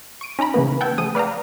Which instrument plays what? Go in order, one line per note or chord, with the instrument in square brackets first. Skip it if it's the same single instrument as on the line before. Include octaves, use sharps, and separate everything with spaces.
[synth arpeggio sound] C#6 D7 D#7
C#4 D#4 A#5 B5
C#3 E3 A#3 B3
F#5 G5 A5 E6 G6 G#6
F3 A3 G#4 D#6 D#7
B4 D5 F5 G5 A#5